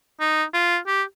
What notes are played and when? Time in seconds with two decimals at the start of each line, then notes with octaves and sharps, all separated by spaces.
0.20 D#4
0.54 F4
0.87 G4